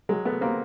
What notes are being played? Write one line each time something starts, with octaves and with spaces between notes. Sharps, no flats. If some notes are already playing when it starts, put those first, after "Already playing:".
F#3 G#3
A3 B3
A#3 C4